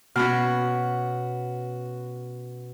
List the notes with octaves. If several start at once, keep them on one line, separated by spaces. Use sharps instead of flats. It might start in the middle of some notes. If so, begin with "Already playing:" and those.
B2 C#4 F#4 B5 F6